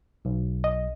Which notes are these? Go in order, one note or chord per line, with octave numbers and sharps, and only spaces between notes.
B1
D#5